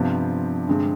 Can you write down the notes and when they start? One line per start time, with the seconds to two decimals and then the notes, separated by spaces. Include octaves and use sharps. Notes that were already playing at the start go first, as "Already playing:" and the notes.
Already playing: G2 C3 F3 B3
0.68 G2 D3 G#3 C4